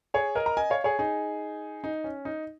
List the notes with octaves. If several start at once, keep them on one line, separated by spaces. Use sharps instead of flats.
G#4 C#5
A#4 D#5
A#5
D#5 G#5
C#5 F5
G#4 C#5
D#4 G#4
D#4
C#4
D#4